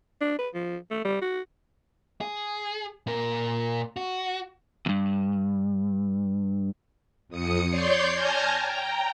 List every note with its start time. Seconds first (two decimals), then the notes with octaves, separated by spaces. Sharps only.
0.21 D4
0.39 B4
0.54 F3
0.91 A3
1.04 G3
1.21 F#4
2.21 G#4
3.07 A#2 A#4
3.97 F#4
4.86 E2 G2
7.28 F2 D#6 C#7
7.69 C#5 D5 C6 G6 C7
8.14 G#5 A5 F6 G6 G#6 A#6
8.57 G5 A#5